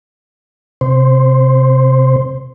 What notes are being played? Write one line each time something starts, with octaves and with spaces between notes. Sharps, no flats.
C3 C5